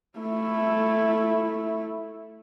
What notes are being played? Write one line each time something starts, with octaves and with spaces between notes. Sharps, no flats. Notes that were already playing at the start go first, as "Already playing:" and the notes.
A3 E4